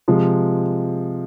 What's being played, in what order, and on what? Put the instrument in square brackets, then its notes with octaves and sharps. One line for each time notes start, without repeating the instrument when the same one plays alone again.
[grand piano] C3 F3 G#3